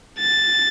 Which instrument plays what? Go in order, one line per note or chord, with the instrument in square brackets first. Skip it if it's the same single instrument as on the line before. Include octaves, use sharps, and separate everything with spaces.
[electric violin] A6